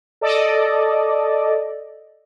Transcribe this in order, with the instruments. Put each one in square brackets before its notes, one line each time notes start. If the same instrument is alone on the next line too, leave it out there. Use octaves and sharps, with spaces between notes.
[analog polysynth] A4 D5 D#5